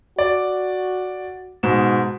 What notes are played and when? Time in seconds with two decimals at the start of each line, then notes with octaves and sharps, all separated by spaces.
0.19 F#4 D5
1.63 G#2 B2 E7